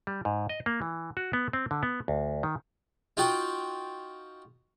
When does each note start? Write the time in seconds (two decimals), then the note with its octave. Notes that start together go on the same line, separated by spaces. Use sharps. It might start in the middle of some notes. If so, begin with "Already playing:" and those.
0.07 G3
0.25 G#2
0.49 D#5
0.66 A#3
0.82 E3
1.17 F#4
1.33 B3
1.53 C4
1.71 D3
1.83 B3
2.08 D2
2.43 D#3
3.17 D#4 F4 F#4 G5